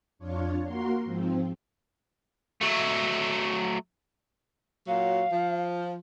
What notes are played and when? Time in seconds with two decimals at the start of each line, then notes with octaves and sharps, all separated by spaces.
0.19 F2 D4 F4 C#5
0.63 A#3 F#4 A#4 C6
1.04 G#2 F3 C4
2.61 F#3 A3
4.87 A#2 F#3 F5
5.32 F3